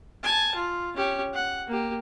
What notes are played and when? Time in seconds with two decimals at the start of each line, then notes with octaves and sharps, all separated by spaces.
0.23 G#5 A5
0.55 F4
0.96 C#4 G4
1.34 F#5
1.67 A#3 G4